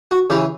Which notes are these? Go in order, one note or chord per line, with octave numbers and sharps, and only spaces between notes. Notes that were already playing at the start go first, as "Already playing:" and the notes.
F#4
C#3 E3 G4